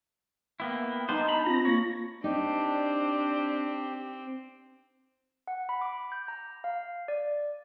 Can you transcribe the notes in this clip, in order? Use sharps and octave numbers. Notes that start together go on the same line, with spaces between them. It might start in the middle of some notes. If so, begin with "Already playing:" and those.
A#3 B3 E4 G5
G3 B3 D#4 C5 A5
D4 A#5 B5
C4 F4 A#6
A#3 C#5
C4 D4 D#4 G4
F#5
B5
D6
G6
A#5
F5
D5